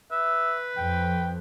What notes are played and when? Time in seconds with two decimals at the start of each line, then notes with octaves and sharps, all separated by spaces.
0.11 B4 E5
0.77 F2 G5